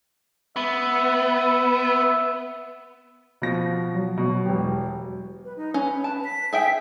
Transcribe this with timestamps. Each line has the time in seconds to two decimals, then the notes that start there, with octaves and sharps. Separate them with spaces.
0.56 B3 E5
3.42 B2 F3 A#6
3.94 F#3
4.17 B2
4.46 E1 G4
5.44 B4
5.57 D#4
5.74 C#4 B4
6.04 A5
6.24 B6
6.53 G#4 E5 G5